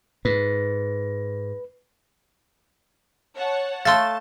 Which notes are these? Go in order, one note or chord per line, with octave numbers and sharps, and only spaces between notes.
G#2 B4
C#5 F#5 A5
A3 A4 F5 A5 C6 C#6 A6